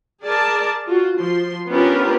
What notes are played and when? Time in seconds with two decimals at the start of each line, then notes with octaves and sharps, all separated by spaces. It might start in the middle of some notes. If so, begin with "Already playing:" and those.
0.23 G#4 A#4 D5 A5
0.86 F4 F#4
1.16 F3 C6
1.67 B3 C#4 D4 F4 G4 A#4